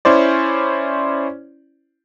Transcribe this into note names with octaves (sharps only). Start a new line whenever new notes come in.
C#4 E4 C5 D5